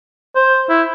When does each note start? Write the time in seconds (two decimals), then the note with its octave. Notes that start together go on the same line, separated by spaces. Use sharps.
0.36 C5
0.69 E4